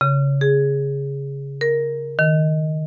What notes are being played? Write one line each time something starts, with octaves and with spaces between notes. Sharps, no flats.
C#3
G#4
A#4
D#3